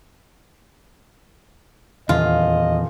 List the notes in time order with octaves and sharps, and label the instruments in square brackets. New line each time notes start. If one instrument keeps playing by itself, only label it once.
[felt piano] D#1 [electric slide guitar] E2 [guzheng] F4 [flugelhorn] D#5